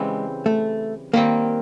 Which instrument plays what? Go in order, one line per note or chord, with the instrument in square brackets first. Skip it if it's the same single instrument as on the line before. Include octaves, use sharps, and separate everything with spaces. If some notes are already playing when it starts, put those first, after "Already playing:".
Already playing: [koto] C#3 E3 G3 C4 [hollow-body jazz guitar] G#3
[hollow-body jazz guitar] A3
[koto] D#3 G3 C4 [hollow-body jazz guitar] A#3